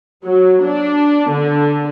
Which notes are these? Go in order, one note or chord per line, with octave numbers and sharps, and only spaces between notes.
F#3
D4
D3